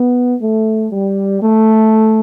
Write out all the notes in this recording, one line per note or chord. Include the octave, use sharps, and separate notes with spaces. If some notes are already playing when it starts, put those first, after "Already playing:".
Already playing: B3
A3
G3
A3